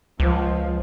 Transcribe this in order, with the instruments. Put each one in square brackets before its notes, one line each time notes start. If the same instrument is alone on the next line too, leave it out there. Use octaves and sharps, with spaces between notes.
[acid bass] C#2 [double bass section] F3